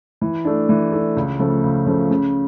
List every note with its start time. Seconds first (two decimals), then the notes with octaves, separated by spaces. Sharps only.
0.21 E3
0.45 A3 D4
0.69 E3
0.92 A3 D4
1.16 C#2
1.39 C#3 F3 A3
1.63 C#2
1.86 C#3 F3 A3
2.10 C#3